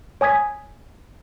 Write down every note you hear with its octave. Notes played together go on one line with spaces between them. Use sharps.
C#5 G#5 D#6 G#6 B6